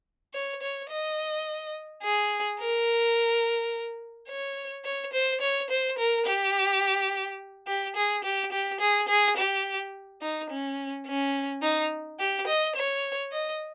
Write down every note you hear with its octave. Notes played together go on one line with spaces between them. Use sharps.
C#5
C#5
D#5
G#4
A#4
C#5
C#5
C5
C#5
C5
A#4
G4
G4
G#4
G4
G4
G#4
G#4
G4
D#4
C#4
C#4
D#4
G4
D#5
C#5
D#5